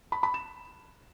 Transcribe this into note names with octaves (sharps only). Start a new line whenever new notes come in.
B5
B5
E7